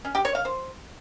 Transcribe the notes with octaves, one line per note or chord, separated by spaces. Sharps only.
C#4
G4
C#5
F5
C5